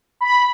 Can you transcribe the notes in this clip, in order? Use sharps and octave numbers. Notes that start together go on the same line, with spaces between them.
B5